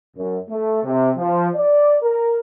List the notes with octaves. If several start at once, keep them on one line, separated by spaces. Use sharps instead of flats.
F#2
A3
C3
F3
D5
A#4